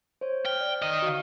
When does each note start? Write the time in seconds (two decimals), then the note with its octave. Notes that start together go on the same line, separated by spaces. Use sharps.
0.21 C5 C#5
0.46 G5 F6
0.61 D5
0.82 D#3 D#5 D#6 F6
1.02 F#4 F5